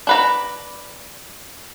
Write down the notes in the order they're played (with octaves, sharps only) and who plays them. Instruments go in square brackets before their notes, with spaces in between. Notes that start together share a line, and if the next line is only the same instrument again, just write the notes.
[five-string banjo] D4 B4 A#5